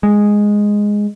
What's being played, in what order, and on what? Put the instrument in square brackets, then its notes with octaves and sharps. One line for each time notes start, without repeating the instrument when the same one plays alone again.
[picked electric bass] G#3